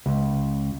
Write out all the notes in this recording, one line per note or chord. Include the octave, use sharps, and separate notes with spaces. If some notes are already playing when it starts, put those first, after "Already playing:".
C#2